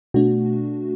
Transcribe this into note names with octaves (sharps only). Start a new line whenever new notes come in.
B2 A3 D4 F#4